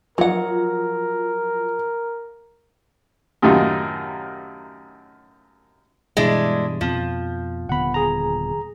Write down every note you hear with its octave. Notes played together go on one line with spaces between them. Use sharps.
F3 F#3 A#4 F#5
F#2 A2 C3 D#3 D#4 F4
G2 B2 E3 G#3 D4 E4
F2 B2 F3 C4
D#1 D3 B3 F#5 B5
G#4 A#5